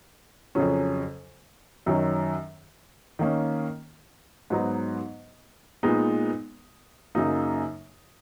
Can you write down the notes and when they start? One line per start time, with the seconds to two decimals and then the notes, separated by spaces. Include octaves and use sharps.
0.55 F2 C#3 F#3 C#4
1.86 F#2 D#3 F#3 C#4
3.19 D#3 A#3 C#4
4.50 G#2 F#3 B3 D#4
5.83 A#2 G#3 B3 D#4
7.15 F#2 C#3 F#3 A#3 D#4